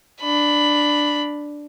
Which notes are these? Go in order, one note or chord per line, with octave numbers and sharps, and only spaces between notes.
D4 B5